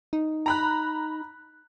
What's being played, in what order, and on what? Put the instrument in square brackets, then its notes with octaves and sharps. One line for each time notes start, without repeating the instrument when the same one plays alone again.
[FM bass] D#4
[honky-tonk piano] A#5 B5 F#6